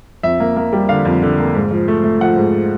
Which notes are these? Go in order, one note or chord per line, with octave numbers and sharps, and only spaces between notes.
F2 E5
A#3
A#3
G3
D3 F5
F2
D3
A#3
G#2
F3
A3
A3
F3 F#5
G#2